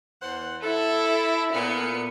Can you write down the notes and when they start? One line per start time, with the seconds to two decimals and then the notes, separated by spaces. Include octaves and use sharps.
0.22 E2 C5 F#5
0.63 E4 A4
1.53 A#2 B3 C#7